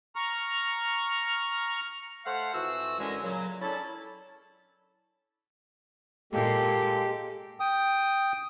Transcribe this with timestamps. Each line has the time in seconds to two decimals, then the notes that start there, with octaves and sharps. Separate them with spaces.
0.16 A#5 C#6 F6
2.25 A3 C5 F5 F#5
2.54 F2 E3 F#4 E6
2.99 F#2 D3 G#3 C#4 D#5
3.23 A#2 C#3 F#3
3.61 C#4 D4 E4 A4 A5
6.33 A#2 G#3 A#3 G4 A4
7.60 G5 D#6